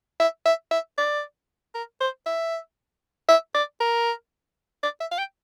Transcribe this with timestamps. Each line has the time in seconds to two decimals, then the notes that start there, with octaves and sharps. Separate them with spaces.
0.20 E5
0.45 E5
0.71 E5
0.98 D5
1.75 A#4
2.00 C5
2.26 E5
3.28 E5
3.55 D5
3.81 A#4
4.83 D5
5.00 E5
5.11 F5
5.18 G5